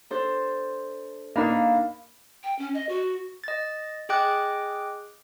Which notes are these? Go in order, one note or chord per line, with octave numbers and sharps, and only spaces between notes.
D4 A4 C5
A#3 D4 D#4 F5 B5 E6
G5
C#4
D#5
F#4
D#5 A6
G#4 D#5 G5 D6 F#6